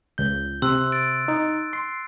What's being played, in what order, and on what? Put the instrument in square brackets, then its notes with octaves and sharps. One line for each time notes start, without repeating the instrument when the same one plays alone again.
[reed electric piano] C#2 G6
[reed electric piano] C3 [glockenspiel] C6 E6 F#6
[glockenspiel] A6 D7
[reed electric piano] D#4
[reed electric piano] C6 [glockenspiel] C7